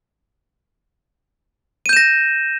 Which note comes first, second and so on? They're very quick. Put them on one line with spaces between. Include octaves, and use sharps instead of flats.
D#7 G6 E7 A#6